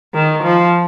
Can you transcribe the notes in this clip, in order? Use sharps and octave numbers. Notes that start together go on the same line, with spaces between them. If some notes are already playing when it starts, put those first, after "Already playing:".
D#3
F3